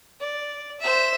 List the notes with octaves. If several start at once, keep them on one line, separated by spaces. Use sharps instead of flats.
D5
C5 E5